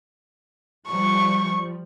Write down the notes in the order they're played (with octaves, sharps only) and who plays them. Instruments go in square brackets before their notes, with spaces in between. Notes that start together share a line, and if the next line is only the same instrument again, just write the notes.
[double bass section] F3 G3 [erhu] C#6